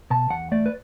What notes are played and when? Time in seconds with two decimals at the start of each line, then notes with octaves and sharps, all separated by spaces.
0.10 B2 A5
0.30 E2 F#5
0.52 A3 D5
0.66 B4